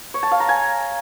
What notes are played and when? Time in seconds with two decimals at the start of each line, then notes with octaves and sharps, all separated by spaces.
0.14 C#5
0.23 A5
0.31 F5
0.40 A#5
0.49 G#5